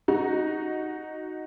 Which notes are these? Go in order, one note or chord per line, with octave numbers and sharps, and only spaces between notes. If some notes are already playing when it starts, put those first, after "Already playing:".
D#4 F#4